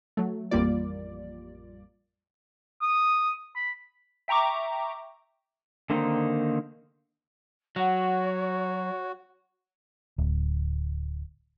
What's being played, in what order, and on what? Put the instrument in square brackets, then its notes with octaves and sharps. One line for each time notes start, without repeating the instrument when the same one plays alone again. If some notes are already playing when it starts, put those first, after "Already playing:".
[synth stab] F#3 A3
A1 F2 G3 A#3 F4 D5
[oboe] D#6
B5
[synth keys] E5 G5 A#5 C#6 D6
[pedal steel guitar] D3 D#3 A#3 C4 D#4
[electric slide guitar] F#3 [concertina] F#4 [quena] C#5 [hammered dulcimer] F#5
[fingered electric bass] D1